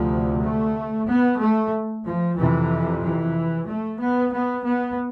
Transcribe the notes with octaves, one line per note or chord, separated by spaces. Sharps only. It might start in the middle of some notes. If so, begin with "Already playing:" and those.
Already playing: D2 C3 F3
A3
B3
A3
F3
F2 C3 E3
E3
A3
B3
B3
B3